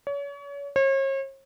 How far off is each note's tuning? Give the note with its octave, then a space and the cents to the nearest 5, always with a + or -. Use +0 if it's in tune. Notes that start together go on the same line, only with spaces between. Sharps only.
C#5 +35
C#5 -40